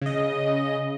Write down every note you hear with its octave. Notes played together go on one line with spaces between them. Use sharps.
C#3 D#5